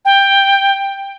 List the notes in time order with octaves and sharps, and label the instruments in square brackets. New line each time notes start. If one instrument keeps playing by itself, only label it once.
[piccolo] G5